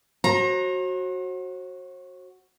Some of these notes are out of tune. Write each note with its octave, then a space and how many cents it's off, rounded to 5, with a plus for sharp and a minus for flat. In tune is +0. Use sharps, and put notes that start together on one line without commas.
F#4 +0 C5 +45 A#5 +0